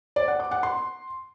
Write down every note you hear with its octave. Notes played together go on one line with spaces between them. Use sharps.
D5
F#5
D6
F#5
C6